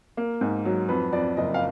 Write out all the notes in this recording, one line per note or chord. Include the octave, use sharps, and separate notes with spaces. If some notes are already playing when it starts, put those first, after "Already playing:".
A#3
G#2
F#3
F2 B4
F2 D5
F#1 D#5
F5